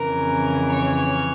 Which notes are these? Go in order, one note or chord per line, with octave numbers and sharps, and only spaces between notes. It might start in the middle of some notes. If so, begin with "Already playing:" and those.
Already playing: F2 C#3 E3 A#4
C#5